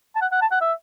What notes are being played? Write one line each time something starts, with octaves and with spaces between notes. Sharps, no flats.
A5
F#5
F#5
A5
F#5
E5